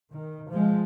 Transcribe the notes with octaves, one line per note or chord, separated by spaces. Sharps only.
D#3
F3 G#3